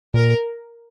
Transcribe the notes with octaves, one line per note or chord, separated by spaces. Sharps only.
A#2 A#4